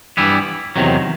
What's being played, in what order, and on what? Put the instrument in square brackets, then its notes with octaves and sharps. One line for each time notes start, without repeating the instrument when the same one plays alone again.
[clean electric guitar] G2 E3 G3 B3 E4
E2 C3 D#3 F#3